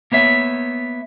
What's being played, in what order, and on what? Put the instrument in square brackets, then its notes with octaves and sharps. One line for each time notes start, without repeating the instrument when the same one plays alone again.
[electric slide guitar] A#3 B3 C#5 E5